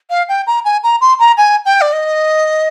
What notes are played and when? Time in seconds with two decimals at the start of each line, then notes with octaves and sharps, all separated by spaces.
0.10 F5
0.28 G5
0.47 A#5
0.64 G#5
0.83 A#5
1.01 C6
1.19 A#5
1.37 G#5
1.65 G5
1.81 D5
1.92 D#5